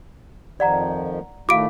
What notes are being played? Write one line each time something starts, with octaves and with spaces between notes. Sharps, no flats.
F2 D#3 F3 D5 F#5 A#5
A2 D#3 A3 F4 F5 D6 D7